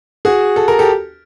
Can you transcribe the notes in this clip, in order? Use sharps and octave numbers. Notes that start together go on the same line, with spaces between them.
F#4 G#4
A4
A#4
G4 A4